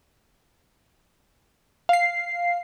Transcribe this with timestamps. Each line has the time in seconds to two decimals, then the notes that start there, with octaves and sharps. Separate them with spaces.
1.89 F5 C7